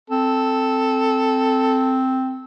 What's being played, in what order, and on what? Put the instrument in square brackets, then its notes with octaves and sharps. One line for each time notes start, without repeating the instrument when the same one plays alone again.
[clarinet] C4 [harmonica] A4